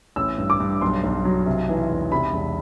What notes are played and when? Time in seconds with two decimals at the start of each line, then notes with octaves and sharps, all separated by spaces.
0.16 A1 E6
0.38 G2
0.50 D6
0.60 G2
0.81 B1 C6
1.04 B1
1.25 F#3
1.46 C3
1.69 E3
1.90 E1
2.12 C3 B5
2.33 E1